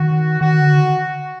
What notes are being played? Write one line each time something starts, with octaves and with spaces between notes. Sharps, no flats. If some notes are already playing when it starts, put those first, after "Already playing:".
Already playing: D#3 F#4
D#3 F#4
D3